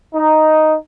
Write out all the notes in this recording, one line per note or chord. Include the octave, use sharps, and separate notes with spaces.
D#4